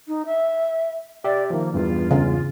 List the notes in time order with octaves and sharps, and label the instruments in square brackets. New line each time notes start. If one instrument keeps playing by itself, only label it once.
[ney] D#4
E5
[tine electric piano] G4 E5 [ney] D5
[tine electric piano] D#3 F3 [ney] A#3
[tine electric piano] E2 G2 E3 [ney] F4
[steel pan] C#3